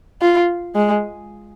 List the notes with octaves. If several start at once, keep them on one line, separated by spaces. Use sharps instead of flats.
F4
G#3